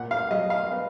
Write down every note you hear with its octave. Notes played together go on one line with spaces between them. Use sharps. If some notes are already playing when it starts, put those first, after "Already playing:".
Already playing: A#2 F#5
F5
F#3 D#5
F5
B3